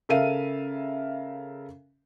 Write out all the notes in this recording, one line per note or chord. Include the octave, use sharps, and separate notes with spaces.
C#3 A4 A#4 E5 F5 D#7